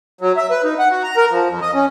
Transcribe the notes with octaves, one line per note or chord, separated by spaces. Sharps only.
F#3
E5
B4
D#4
F#5
F#4
A#5
A#4
F3
F2
D#5
C#4